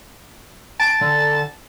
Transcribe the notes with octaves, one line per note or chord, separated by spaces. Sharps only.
A5 D7
D3